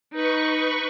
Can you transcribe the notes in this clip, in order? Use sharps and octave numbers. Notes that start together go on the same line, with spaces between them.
D#4 B4 C#6